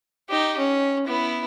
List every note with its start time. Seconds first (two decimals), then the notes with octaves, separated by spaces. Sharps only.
0.29 D#4 G4
0.58 C#4
1.07 B3 E4